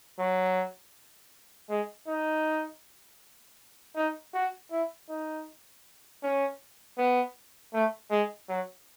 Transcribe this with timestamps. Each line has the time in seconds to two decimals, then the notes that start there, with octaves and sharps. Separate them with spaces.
0.19 F#3
1.70 G#3
2.08 D#4
3.96 D#4
4.34 F#4
4.71 E4
5.09 D#4
6.23 C#4
6.98 B3
7.74 A3
8.11 G#3
8.49 F#3